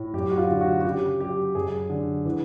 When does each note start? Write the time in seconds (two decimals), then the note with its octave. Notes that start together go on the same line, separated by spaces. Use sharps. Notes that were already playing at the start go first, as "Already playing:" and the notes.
Already playing: A2
0.14 F#2 G4
0.31 F#4
0.37 F4
0.49 D3 F4
0.61 F#4
0.80 F#4
0.84 C#3 G4
1.20 F#3 G4
1.55 F#2 G#4
1.90 D3
2.25 E3